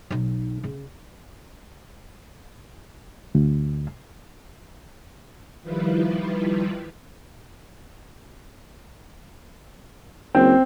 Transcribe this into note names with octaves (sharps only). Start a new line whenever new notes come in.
B1 D#4
C#3
D2
D#3 F3 G3 E4 F4 B4
F#1 C4